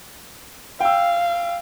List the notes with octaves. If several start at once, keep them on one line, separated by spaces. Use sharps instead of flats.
F5 G5 E6